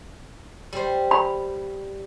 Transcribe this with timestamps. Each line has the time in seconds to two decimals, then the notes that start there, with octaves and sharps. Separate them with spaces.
0.73 G3 C5
1.11 B5